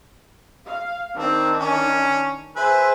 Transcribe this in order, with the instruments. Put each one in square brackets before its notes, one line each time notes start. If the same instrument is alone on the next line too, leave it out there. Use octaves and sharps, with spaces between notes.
[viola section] F5
[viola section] D#3 D4 [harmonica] C4
[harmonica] C#4
[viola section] G#4 C5 E5 [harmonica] B4 G#5